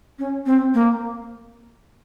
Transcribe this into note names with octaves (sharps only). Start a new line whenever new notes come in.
C#4
C4
A#3